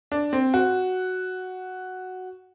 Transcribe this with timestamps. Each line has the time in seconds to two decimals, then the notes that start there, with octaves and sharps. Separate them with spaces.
0.12 D4
0.33 C4
0.54 F#4